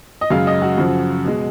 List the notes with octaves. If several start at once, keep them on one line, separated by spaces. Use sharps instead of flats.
D#5
F#2 C#3 G#3 F5
D#5
F#4
F#2 C#3 F3
B2 G#3